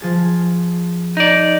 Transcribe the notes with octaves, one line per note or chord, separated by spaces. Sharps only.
F3 G#4 A6
D#4 D5